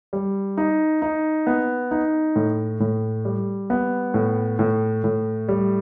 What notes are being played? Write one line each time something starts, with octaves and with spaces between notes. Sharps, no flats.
G3
D#4
D#4
B3
D#4
A2
A2
G3
B3
A2
A2
A2
G3